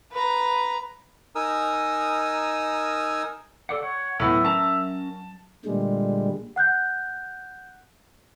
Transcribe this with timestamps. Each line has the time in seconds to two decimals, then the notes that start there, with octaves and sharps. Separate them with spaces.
0.12 B4 A#5
1.35 D#4 A#4 G#5 D#6 E6
3.69 A4 D5 F#5
3.83 C#5 F#5
4.20 A2 F#3 B3 E5
4.45 C#4 A#4 A5 A#5
5.65 A#2 D3 G3 G#3
6.56 F#5 F#6 G6